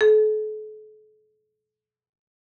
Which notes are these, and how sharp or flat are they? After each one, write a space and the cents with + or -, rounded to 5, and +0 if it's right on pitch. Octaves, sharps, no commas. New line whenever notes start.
A4 -40